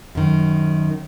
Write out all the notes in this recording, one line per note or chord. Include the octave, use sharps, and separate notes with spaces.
F#2 D#3